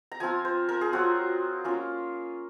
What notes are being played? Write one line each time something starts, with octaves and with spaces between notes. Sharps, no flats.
A#5
F3 C4 F4 G#5
C5
A#4
G#4
F#3 C4 F4 F#4
A#3 C#4 F4